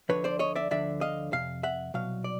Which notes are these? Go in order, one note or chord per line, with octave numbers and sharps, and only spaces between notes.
D2 D3 F3 B4 C#5
C5 D5
C#5 D#5
D5 E5
D2 D3 F3 D5 E5
D#5 F5
F2 C3 F5
E5 F#5
C2 B2 F#3 F5
D5